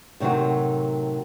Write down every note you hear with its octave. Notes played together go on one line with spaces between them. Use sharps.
A2 C3 D#3 F3 F#3